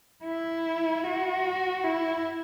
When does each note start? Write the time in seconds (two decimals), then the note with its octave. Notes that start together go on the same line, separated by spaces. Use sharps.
0.24 E4
1.04 F#4
1.84 E4